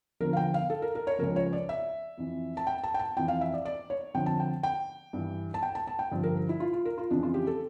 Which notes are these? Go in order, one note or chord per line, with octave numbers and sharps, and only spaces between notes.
E2 D3 F3 A#4
F5
G5
F5
A4
A#4
A#4
C#5
C#2 C#3 F3 A#4
C#5
D5
E5
F2 E3
A5
G5
A5
G5
A5
F2 E3 G5
F5
E5
D5
D5
C#5
F2 D3 F3 G5
A5
G5
G5
G2 E3
A5
G5
A5
A5
G5
G2 D3 F3
A#4
E4
F4
F4
A#4
F4
F2 C#3 E3 D4
F4
G4
A4